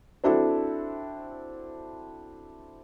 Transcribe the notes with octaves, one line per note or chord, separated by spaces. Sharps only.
C4 D4 E4 F#4 A4